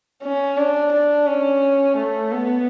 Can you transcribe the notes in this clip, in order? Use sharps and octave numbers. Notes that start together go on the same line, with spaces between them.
C#4
D4
D4
C#4
A3
B3